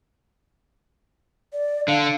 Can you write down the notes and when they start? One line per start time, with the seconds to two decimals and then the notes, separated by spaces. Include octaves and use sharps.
1.53 D5
1.88 D3 F5